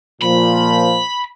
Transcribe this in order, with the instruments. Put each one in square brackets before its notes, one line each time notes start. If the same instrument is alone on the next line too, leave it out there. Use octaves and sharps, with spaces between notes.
[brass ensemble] A#2 F3 [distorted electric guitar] B5